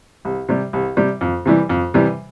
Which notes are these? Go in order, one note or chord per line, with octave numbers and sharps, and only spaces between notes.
C2
C3 G3
C2
C3 G3
F2
C3 E3 G3
F2
C3 E3 G3